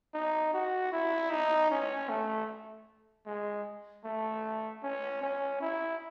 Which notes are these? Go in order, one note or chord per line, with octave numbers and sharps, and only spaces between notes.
D#4
F#4
E4
D#4
C#4
A3
G#3
A3
C#4
C#4
E4